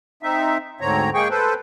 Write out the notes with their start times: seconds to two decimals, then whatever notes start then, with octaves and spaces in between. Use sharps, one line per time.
0.23 C4 D#4 E5
0.81 D2 G#2 D3 C4 C#5 A#5
1.14 G#3 A#3 G#4 G5 C#6
1.30 A4 B4 C5